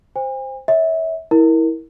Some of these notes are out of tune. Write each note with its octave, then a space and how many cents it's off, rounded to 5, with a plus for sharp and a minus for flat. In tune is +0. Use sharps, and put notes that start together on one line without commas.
C5 +0 G#5 -45
C#5 +15 E5 -25
E4 -20 A#4 +0